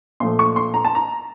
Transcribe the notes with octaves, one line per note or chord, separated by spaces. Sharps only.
A#2 F3 A3 C6
C#6
C6
A#5
A5
A#5